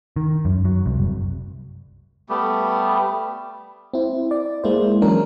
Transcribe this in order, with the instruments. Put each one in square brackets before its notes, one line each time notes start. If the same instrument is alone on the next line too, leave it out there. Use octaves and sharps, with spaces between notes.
[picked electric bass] D#3
F#2
F#3
C2
F#1
[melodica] G3 A3 B3 G4
[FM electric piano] C4 E4
D5
G#3 A#3 E4 C5
E3 F#3 C#4 D4 A#4